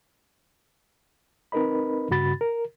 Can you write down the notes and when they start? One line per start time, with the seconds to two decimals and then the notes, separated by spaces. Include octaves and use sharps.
1.52 C4 D#4 A#4 B4 D#5 B5
2.10 G2 C#3 F#4 B5 A6
2.41 A#4